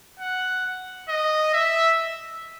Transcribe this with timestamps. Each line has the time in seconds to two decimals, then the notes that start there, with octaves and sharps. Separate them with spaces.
0.19 F#5
1.09 D#5
1.54 E5